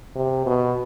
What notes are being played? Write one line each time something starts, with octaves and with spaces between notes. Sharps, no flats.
C3
B2